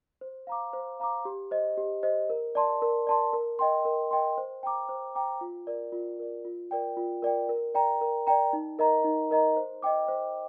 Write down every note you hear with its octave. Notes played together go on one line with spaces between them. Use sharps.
C5
F5 A#5 D6
C5
F5 A#5 D6
G4
C5 D#5
G4
C5 D#5
A#4
D5 A5 C6
A#4
D5 A5 C6
A#4
D#5 G5 C6
A#4
D#5 G5 C6
C5
G5 A#5 D6
C5
G5 A#5 D6
F4
A#4 D5
F4
A#4 D5
F4
A#4 D5 G5
F4
A#4 D5 G5
A#4
D5 G5 A#5
A#4
D5 G5 A#5
D#4
A#4 D#5 A#5
D#4
A#4 D#5 A#5
C5
D#5 G5 D6
C5